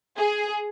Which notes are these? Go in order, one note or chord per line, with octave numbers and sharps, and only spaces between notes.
G#4